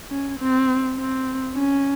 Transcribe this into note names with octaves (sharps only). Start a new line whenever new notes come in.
C#4
C4
C4
C#4